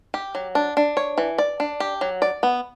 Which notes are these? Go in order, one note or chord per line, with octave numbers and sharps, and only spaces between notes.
G4
F#3
D4
D4
C#5
E3
D5
D4
G4
F#3
D5
B3